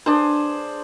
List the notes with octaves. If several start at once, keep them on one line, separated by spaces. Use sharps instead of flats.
D4 G#4 C5